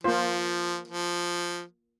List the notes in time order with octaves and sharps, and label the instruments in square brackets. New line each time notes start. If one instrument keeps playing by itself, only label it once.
[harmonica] F3 [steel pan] A#3 F4 C5
[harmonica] F3